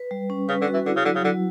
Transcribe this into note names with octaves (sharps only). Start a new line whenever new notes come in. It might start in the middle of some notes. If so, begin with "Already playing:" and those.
Already playing: B4
G3
C#4
C#3 B4
D3
F#4
E3
D3 E4
C#3
D3 F#3
C#3
D3 F#3